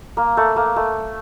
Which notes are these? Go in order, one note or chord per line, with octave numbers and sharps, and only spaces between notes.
A#3
A3
A#3
A3